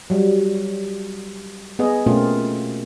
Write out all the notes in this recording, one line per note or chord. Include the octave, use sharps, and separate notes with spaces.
F#3 G3
B3 G#4 D#5
B2 A3 A#3 C4 C#4 F4